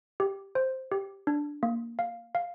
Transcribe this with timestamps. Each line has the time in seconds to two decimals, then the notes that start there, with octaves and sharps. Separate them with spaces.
0.20 G4
0.55 C5
0.92 G4
1.27 D4
1.63 A#3
1.99 F5
2.35 F5